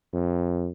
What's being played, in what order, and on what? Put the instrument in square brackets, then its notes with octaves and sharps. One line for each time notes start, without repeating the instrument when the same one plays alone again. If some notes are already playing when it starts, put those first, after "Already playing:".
[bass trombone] F2